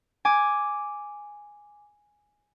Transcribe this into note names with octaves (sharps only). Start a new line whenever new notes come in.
G#5 D6